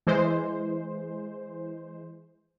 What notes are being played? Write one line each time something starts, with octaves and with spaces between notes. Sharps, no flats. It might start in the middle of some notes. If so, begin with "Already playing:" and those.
E3 G#3 C5